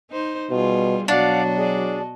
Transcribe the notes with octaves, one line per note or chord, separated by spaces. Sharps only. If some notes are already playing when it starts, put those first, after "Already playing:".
D#4 C5
B2 G3 F4 G#4
B2 F#3 D4 F#4 D5 D#5 F5 F#5
G#4 D5